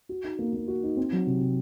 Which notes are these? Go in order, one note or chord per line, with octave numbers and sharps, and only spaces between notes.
F#4
D#4
A#3
A#3
F#4
D#4
C4
F#3
C3
C3